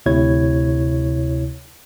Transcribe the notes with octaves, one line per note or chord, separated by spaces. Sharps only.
D2 C3 E4 C#5 G#6